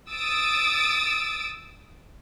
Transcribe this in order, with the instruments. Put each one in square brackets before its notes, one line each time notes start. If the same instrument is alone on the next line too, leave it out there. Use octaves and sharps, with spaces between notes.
[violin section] D#6 E6 A6 D7